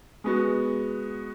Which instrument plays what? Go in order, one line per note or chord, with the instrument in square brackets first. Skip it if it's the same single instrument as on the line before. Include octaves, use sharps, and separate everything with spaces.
[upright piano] G#3 B3 F#4